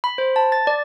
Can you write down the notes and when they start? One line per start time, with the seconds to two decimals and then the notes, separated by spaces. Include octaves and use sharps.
0.04 B5
0.18 C5
0.36 A5
0.52 A6
0.67 D5